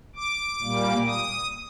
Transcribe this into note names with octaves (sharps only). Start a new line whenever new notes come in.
D6
A#2 G3 A#3
D#6